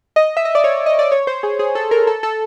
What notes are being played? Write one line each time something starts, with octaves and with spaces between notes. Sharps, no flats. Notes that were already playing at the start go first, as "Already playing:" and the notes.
D#5
E5
D#5
D5
C#5
D#5
D5
C#5
C5
G#4
G#4
A4
A#4
A4
A4